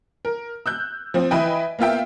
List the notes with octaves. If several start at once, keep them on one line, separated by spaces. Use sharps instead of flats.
A#4
E6 F#6 G6
F3 C4
E3 E4 B4 D#5 G5
A#3 B3 F4 E5 G5